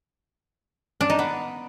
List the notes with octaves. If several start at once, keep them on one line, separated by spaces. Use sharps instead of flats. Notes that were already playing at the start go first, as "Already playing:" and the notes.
D4
D#4
B3